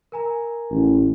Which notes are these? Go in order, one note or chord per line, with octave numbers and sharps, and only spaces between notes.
A#4 G#5 A#5
A1